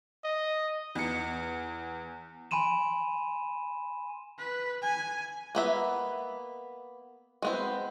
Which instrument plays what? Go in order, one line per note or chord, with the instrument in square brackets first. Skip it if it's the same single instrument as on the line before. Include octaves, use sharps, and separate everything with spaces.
[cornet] D#5
[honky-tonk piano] E2 C#7
[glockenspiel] G#5 B5 C6 D#7 E7
[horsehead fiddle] B4
G#5
[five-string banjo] A#3 B3 E5
G#3 B3 C4